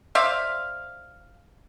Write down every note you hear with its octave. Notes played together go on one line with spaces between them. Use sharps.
C5 D5 E5 F5